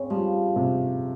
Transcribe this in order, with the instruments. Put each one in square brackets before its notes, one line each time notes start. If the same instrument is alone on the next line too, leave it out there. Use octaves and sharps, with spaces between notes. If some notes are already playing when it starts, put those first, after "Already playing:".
Already playing: [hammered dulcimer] C#3 [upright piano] C4
[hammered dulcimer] F3 [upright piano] G3
[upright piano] C3